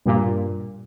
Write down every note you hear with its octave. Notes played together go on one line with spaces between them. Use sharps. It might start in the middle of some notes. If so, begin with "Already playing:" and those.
G2 A#2